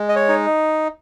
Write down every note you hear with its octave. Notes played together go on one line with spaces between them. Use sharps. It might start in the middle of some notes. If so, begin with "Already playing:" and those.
Already playing: G#3
D#5
C#5
D#4